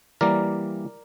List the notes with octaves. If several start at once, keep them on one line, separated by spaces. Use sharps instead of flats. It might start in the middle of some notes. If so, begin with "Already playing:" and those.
E3 G3 A#3 A#4 D5